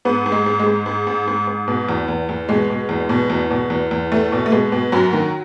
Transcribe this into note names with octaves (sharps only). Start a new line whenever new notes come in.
G#2 B3
G#2
G#3
G#2
G#3
G#2
G#2
G#2
G#2
G#2
B2
E2
E2
E2
B2 G#3
B2
E2
B2
E2
B2
E2
E2
E2 A3
B2
A3
B2 G#3
B2
F#2 F#3
D#3